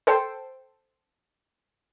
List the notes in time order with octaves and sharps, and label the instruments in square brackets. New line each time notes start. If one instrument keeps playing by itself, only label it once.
[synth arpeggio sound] A4 C5 G5